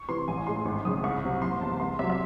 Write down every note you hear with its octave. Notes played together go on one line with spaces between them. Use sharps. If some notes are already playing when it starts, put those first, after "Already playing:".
Already playing: C#6
C3 E3 C6
A1 G#5
A2 G#3 C6
G#1 C#6
F#2 C#3 G#3 D#6
C2 C#6
C3 F#3
F#1 C6
E2 C3 A5
C2 C6
C3 F#3 E5
E5